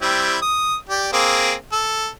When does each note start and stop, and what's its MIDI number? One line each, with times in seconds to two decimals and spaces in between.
0.02 0.37 55
0.02 0.37 60
0.02 0.37 64
0.42 0.76 87
0.89 1.09 67
0.89 1.09 74
1.13 1.53 58
1.13 1.53 60
1.13 1.53 68
1.72 2.07 69